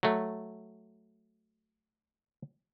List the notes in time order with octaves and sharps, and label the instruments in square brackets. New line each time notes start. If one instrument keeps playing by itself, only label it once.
[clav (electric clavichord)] F#3 A3